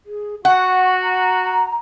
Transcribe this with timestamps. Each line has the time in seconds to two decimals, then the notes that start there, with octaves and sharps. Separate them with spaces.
0.06 G#4
0.45 F#4 F#5 C#6
1.02 A#5